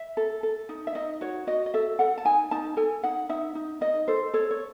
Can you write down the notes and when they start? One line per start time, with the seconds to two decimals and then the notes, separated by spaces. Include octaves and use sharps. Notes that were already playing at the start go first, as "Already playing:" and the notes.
Already playing: E5
0.17 A4
0.43 A4
0.69 D#4
0.87 E5
0.95 D#4 D#5
1.21 F#4 C#5
1.47 F#4 D#5
1.66 D#5
1.74 A4 E5
1.99 A4 F#5
2.18 A5
2.25 D#4 G#5
2.51 D#4 A5
2.77 A4 G#5
3.03 D#4 F#5
3.29 D#4 E5
3.55 D#4
3.81 D#4 D#5
4.08 A4 C5
4.34 A4 C#5
4.51 C#5